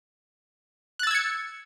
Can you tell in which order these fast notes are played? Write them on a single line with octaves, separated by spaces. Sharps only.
F#6 A6 E6 G#6 C#7